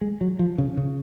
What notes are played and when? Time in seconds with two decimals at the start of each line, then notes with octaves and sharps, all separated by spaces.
0.01 G#3
0.21 F#3
0.39 F3
0.58 C#3
0.77 C#3